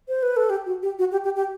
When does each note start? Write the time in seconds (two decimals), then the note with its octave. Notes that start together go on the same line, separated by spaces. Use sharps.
0.09 C5
0.23 B4
0.37 A4
0.50 G4
0.66 F#4
0.83 G4
0.99 F#4
1.12 G4
1.24 G4
1.36 G4